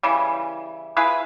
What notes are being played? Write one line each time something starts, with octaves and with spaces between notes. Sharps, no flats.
C#3 E3 G3
E4 F4 G#4 B4